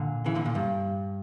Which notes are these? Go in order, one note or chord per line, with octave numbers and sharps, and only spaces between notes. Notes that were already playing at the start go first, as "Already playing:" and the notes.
Already playing: A#2 D3
C#3 E3
A#2 D3
A#2
G2